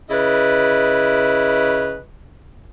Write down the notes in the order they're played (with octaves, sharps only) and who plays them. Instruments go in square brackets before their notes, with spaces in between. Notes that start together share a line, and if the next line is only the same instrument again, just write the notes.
[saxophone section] C#3 E4 B4 D#5